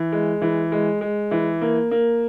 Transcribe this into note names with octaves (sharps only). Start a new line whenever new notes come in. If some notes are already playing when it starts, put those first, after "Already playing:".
Already playing: E3
G#3
E3
G#3
G#3
E3
A#3
A#3